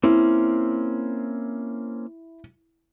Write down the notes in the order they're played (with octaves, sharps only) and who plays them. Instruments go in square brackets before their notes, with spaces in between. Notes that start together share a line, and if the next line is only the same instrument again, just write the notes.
[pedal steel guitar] A#3 C4 C#4 [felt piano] E4